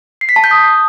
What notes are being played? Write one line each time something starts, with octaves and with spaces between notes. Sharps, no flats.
C7
B6
A5
G6
D#6